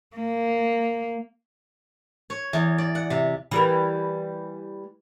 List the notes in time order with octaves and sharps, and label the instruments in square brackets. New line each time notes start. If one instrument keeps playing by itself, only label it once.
[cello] A#3
[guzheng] C#5
E2
D5
F#5
C3
[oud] E3 G3 A#3